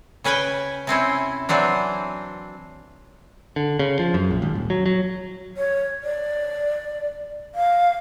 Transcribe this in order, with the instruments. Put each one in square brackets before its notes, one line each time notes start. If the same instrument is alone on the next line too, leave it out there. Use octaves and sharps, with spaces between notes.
[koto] C#3 C#4 B4 G5 G#5
C3 C4 C#4 E4
E3 F#3 C4 D4
[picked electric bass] D3
C#3
F3
F#2
A#1
G#1
D#1
F#3
F#3
[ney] C#5
D5
F5